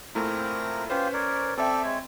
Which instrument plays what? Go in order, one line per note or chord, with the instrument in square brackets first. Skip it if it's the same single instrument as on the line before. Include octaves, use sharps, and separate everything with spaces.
[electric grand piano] A#2 A3 E4 [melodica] C4 A#4 A#5
[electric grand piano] C#4 B4 C5 [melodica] F4 G4 F5
[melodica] A#4 C#5 D5
[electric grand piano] C4 E5 G5 [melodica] A4 D5
[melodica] G#3 C#5